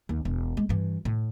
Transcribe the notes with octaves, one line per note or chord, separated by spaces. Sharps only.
D#2
E1
G#3
G2 E3
A2